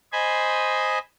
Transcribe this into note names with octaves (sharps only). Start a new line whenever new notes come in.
C5 D#5 G#5 B5